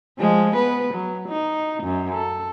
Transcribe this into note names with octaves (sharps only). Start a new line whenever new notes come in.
F3 G#3
B3 B4
F#3
D#4
F#2
A4